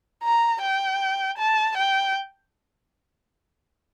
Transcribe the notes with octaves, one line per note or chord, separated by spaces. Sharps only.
A#5
G5
A5
G5